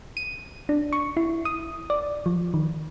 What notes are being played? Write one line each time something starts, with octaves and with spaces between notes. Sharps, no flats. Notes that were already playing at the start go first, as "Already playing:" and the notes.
D#7
D4
C#6
E4
D#6
D5
F3
D#3